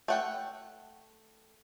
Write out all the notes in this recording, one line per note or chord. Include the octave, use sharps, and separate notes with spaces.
A3 F#5 G5